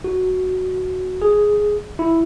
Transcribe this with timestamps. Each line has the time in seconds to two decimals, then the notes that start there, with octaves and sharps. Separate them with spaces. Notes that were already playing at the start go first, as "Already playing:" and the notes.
0.04 F#4
1.22 G#4
1.99 E4